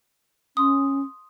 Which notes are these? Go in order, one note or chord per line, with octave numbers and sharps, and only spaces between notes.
C#4 C6 D#6